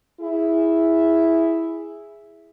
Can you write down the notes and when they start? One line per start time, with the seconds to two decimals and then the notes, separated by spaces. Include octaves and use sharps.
0.21 E4 G#4